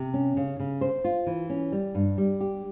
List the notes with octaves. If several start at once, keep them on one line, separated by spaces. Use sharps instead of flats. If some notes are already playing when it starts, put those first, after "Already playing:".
Already playing: C3
C#4
C#3
C#3
C5
F4
E3
C#4
G3
G2
G3
G4